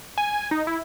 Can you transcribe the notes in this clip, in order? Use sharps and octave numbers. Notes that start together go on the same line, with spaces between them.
G#5
D#4
E4